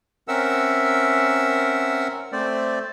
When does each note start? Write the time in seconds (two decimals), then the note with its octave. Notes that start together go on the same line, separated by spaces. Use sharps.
0.28 C4 C#4 A#4 E5 F#5 E6
2.32 A3 C4 C5 D5